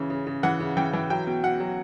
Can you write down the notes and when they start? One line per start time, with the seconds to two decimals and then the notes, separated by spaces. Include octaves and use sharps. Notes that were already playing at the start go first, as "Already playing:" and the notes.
Already playing: C#3 E3
0.10 C#3
0.27 C#3
0.43 E3 F#5
0.60 C#3
0.77 E3 G5
0.93 E3
1.10 F#3 G5
1.27 B2
1.43 B2 F#5
1.60 F#3